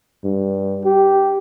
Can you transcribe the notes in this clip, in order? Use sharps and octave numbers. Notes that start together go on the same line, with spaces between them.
G2
G4